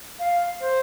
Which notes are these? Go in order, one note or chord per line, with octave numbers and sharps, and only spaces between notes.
F5
C5